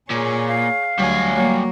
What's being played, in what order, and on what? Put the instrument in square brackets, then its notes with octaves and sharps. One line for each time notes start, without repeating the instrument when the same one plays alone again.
[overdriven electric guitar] A#2 [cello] G#4 C#5
[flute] F5
[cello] D2 [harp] F#3 [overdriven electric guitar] G3 G#5
[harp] F#3 [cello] A#3